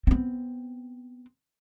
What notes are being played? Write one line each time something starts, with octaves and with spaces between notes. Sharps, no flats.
B3 C4